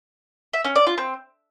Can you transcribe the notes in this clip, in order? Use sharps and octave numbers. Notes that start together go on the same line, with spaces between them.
E5
C#4
D5
F4
C4